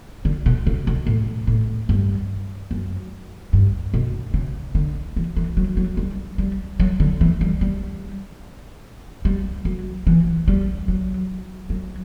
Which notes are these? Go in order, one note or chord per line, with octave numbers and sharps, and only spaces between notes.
D3
B2
C#3
B2
A2
A2
G2
F#2
G2
B2
C#3
D3
E3
E3
F#3
F#3
G3
G3
F#3
D3
E3
G3
G3
G3
F#3
E3
G3
F#3
F#3